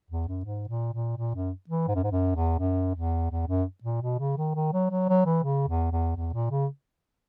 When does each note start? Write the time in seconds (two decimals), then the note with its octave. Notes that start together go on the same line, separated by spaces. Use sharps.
0.10 E2
0.28 F#2
0.45 G#2
0.69 A#2
0.93 A#2
1.17 A#2
1.35 F#2
1.69 E3
1.88 G#2
1.95 F#2
2.04 G#2
2.11 F#2
2.35 E2
2.59 F#2
2.95 E2
3.31 E2
3.48 F#2
3.83 A#2
4.02 B2
4.19 C#3
4.37 D#3
4.55 D#3
4.73 F#3
4.91 F#3
5.09 F#3
5.26 E3
5.44 C#3
5.68 E2
5.92 E2
6.16 E2
6.33 A#2
6.50 C#3